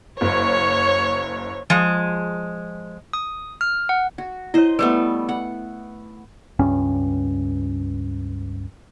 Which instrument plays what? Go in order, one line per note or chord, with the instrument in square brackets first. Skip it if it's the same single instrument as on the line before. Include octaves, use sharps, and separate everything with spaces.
[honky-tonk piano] F#1 [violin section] C#5
[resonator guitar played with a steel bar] F3 G#3 G#4
[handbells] D#6
F6
F#5
[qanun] F#4
[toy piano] E4 C#5 [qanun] C5 D#5
[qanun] G3 A3 B3 [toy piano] B4
[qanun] F#5
[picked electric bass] C#2 G2 C#4